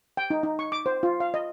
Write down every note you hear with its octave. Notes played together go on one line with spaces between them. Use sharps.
G5
D#4
D#4
C#6
D6
C5
F4
F5
D#5